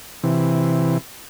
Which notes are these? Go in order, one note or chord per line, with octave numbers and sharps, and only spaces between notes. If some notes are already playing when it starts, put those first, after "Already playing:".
C3 E3